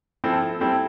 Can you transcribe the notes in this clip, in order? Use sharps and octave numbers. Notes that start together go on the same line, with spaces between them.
F3 C4 E4 A4
G3 C4 E4 A4